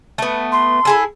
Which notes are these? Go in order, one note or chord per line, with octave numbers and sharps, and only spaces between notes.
A3 B3
C6
E4 G#4 A4